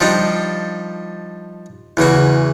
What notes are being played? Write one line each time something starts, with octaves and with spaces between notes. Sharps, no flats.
F3 G3 D4 D#4
E2 C#3 E3 F#4